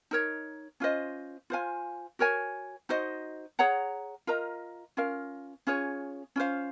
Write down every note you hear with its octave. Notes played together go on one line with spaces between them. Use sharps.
D#4 A#4 C#5
C#4 F4 C5 D#5
F4 C5 F5 G#5
F#4 A#4 C#5 G#5
D#4 F#4 C5 D#5
G#4 C#5 F#5 A#5
F4 A#4 D#5 A#5
C#4 F4 A#4 F5
C#4 F4 G#4 C#5
C#4 F4 C5 F5